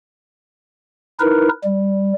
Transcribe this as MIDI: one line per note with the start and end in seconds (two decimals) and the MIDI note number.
1.20 1.48 63
1.20 1.48 64
1.20 1.48 70
1.20 1.48 71
1.64 2.13 55